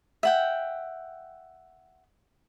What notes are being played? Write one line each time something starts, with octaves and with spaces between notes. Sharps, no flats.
E5 F#5 G5